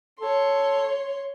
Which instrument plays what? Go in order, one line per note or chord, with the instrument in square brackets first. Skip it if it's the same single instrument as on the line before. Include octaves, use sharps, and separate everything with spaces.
[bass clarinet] A4 [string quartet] C#5 C6